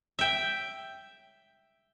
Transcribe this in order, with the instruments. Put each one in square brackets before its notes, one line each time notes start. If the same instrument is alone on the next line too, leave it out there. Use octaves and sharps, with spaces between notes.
[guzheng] E5 G5